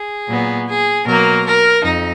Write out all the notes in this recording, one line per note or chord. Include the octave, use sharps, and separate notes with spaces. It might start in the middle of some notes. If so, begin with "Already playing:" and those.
Already playing: G#4
A#2 F#3 B3
G#4
B2 F#3 A#3 A#4
A#4
F2 D#4